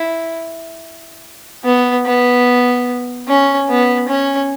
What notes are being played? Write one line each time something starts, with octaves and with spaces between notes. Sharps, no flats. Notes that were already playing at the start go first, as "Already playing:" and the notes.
Already playing: E4
B3
B3
C#4
B3
C#4